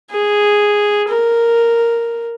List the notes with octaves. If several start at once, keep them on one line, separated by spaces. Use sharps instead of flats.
G#4
A#4